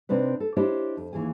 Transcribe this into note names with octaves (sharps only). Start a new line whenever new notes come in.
C3 C4 D4 D#4 B4
A4
D4 E4 G4 C5 C#5 D#5
F2
D#2 E3 G#4 G#5